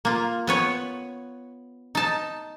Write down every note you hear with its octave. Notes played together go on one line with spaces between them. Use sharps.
A#3 F4
B3 B4 C#5
D#4 A5